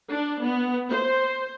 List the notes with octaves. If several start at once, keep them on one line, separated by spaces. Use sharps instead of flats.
D4
B3
C5